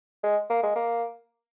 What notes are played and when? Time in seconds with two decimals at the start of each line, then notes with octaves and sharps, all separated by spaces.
0.23 G#3
0.50 A#3
0.63 G#3
0.76 A#3